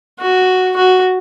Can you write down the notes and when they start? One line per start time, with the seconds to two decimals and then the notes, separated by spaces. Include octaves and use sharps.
0.20 F#4
0.76 F#4